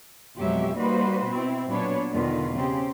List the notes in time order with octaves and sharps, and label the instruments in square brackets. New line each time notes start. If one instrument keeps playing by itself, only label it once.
[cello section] F2 B2 F#3 G#3 G4 E5
G3 A#3 D#4 F#4 B4 C5
B2 C4 E4
A#2 F#3 B3 D4 B4 C#5
E2 B2 D3 D#3 F4 B4
C#3 C4 G4 C5